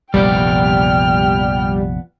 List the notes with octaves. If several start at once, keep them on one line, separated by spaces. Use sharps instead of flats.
F1 A#1 F3 G3 B3 D5 G5 F6